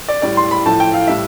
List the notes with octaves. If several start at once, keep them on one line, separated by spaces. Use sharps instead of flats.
D5
A2 G3 D5
C6
B5
A2 F3 A3 A5
G5
F5
A2 G3 E5